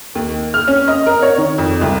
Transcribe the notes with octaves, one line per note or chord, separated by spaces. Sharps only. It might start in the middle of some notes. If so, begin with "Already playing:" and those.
D#2
F6
C#4
D#5
A#4
C#5
D#3
F2
C2